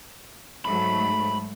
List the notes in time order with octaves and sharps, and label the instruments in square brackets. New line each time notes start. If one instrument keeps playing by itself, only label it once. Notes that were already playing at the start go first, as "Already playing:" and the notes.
[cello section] G#2 F#3 A3 [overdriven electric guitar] B5